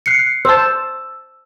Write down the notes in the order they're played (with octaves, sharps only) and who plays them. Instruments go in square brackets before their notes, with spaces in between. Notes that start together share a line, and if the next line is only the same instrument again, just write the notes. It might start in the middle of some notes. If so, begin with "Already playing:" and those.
[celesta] F#6 C7 C#7
[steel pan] C5 A5 [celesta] E6